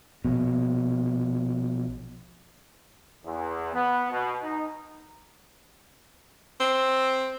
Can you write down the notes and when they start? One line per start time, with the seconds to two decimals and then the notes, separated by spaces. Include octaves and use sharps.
0.24 A#1 B2
3.25 E2
3.73 B3
4.12 B2
4.42 D#4
6.60 C4